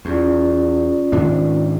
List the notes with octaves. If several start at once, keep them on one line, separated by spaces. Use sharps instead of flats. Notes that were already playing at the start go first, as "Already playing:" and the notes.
E2 C#4 F4 D5
G#2 D#3 D4